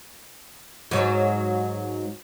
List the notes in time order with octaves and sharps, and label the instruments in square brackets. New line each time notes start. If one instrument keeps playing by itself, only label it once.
[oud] G#2 F#3